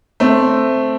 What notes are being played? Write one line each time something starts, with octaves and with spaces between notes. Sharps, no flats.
A3 C4